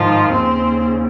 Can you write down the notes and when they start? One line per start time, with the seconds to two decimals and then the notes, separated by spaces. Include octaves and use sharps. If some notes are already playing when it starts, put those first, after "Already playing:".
Already playing: G#2 D#3 F3 F4
0.33 D#2 C#3 C4 C5